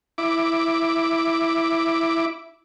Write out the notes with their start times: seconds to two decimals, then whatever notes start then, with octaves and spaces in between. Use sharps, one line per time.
0.18 E4 D6